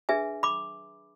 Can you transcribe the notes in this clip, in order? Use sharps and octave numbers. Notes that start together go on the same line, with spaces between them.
D4 G#4 B4 E5 G#5
B5 D6